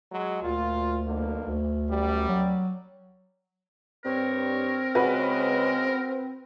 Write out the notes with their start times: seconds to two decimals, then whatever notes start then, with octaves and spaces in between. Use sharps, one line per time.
0.12 F#3 G#3
0.42 D2 A#2 F4
1.07 B1 D3 A#3
1.45 D2
1.89 F#2 G3
2.29 F#3
4.05 G2 G3 C4 A#4 C#5
4.95 C#3 G#3 F#4 B4